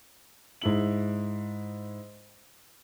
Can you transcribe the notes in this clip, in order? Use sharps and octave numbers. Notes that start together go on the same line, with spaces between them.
G#2 E4 F#7